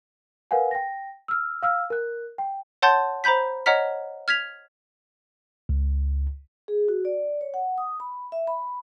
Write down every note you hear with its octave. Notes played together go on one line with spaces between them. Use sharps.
A#4 B4 F5 F#5 G#5
G5 A#6
E6 F6
F5 E6 F6
A#4 F#6
G5
C#5 F#5 A5 C6 G6 A6
C5 A#5 B5 G6 B6
C#5 D#5 F#5 A#5 F6 B6
F6 G#6 B6 F7
C#2
G#4
F#4
D5
C#5
F#5
D#6
B5
E5
B5